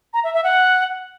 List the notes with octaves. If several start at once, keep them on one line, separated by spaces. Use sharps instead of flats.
A#5
E5
E5
F#5